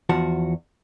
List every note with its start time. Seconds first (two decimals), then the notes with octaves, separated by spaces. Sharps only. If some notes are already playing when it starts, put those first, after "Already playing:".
0.09 E2 F3 F#4 A5